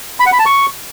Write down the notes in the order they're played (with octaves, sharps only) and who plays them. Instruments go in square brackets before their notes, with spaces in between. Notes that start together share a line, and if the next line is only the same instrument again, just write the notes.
[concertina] B5
F#5
B5
A5
C#6